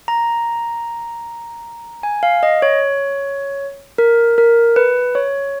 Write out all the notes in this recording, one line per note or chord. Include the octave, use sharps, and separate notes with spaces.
A#5
G#5
F5
D#5
C#5
A#4
A#4
B4
C#5